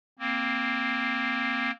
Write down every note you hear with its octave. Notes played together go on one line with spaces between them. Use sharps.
A#3 C4